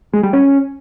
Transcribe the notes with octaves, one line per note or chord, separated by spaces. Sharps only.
G#3
G3
C#4